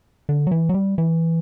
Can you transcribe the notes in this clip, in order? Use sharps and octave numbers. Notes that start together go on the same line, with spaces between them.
D3
F#3
E3
F#3
G3
E3